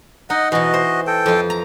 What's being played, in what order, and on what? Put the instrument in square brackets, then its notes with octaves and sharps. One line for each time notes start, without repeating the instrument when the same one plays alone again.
[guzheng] D#4 [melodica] D#5 F#5
[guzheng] B2 E3 [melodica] F#4 D#5
[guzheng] C5
[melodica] A4 G5
[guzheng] F2 F4
A#5